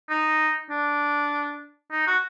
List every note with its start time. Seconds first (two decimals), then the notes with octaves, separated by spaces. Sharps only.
0.09 D#4
0.70 D4
1.92 D#4
2.07 F#4